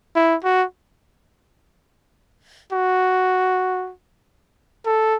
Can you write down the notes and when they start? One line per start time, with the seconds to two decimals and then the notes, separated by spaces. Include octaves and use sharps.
0.15 E4
0.44 F#4
2.72 F#4
4.86 A4